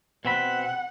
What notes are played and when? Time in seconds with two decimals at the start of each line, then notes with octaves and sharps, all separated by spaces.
0.25 B2 C4 F#5 B5